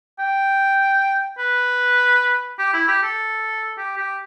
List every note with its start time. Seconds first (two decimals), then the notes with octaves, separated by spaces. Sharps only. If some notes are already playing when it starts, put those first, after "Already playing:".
0.19 G5
1.38 B4
2.59 G4
2.73 E4
2.88 G4
3.03 A4
3.78 G4
3.98 G4